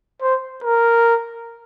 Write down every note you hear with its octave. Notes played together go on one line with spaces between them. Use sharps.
C5
A#4